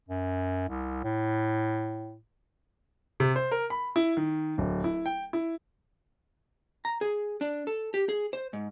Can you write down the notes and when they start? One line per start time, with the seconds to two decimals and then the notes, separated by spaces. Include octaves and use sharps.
0.08 F#2
0.69 C2
1.04 A2
3.20 C3
3.36 C5
3.52 A#4
3.70 B5
3.96 E4
4.17 D#3
4.58 D1
4.84 E4
5.06 G5
5.33 E4
6.85 A#5
7.01 G#4
7.41 D4
7.67 A4
7.94 G4
8.09 G#4
8.33 C5
8.53 G#2